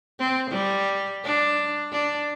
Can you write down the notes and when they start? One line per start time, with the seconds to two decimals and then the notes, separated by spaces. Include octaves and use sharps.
0.20 C4
0.51 G3
1.24 D4
1.92 D4